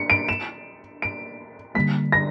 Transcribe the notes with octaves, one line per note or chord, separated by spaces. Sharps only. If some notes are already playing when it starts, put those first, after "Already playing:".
Already playing: D4 C#7
D7
E7
D7
D3 G3 A#3 B6
A#6